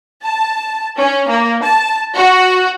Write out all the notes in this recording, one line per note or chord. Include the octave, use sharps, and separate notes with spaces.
A5
C#4
A#3
A5
F#4